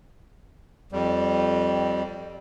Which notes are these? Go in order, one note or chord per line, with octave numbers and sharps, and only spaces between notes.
F2 G3